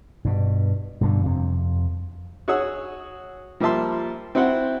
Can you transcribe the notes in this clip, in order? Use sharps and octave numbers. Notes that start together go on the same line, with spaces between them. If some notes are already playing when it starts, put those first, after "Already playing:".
G2 B2
G2 B2 D3
F2 C3
F#4 G#4 C#5 F#5 D#6 E6
F3 G3 A#3 E5 A5 C6
C4 E4 F#4 C5 F#5